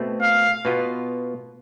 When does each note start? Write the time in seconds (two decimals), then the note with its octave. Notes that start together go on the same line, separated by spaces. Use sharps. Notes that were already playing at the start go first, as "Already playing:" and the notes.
Already playing: B2 A3 C4
0.22 F5
0.65 B2 B3 F4